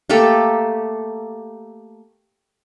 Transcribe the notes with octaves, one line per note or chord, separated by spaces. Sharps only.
A3 A#3 G4 A4